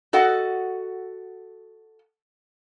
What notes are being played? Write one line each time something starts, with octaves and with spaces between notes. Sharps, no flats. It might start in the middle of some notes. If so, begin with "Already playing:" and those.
F#4 A4 D#5 F#5